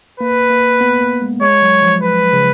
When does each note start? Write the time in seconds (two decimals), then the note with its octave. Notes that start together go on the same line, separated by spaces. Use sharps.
0.20 A#3 B4
0.50 A#3
0.81 B3
1.01 A#3
1.22 G#3
1.41 G#3 C#5
1.62 F#3
1.83 F3
2.03 B4
2.33 C#3